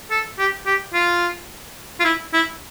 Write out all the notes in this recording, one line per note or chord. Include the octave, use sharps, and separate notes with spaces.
A4
G4
G4
F4
F4
E4
E4